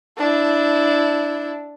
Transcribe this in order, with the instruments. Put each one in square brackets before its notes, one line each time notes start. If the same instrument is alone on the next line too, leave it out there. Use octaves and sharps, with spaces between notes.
[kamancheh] D4 E4